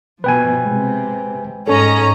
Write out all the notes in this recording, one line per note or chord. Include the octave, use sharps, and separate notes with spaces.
B2 F3 B4 G5 G#5
C3 G#3
G#2 C#4 A4 D#5 A#5